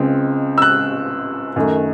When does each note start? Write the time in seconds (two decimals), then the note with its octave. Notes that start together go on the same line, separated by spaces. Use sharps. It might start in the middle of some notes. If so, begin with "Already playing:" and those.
Already playing: C#2 C#3 G#3 C4
0.58 E6
0.62 F#6
1.56 F#2 D#3 A3